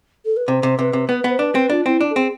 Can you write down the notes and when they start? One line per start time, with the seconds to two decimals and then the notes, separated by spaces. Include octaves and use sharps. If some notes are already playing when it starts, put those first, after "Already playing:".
0.25 A4
0.36 B4
0.48 C3 C5
0.63 C3
0.79 C3 B4
0.93 C3
1.09 B3 B4
1.24 B3
1.29 C5
1.39 D4 B4
1.55 C4
1.70 D4 F4
1.86 C4 E4
2.01 D4
2.10 A4
2.16 C4 G#4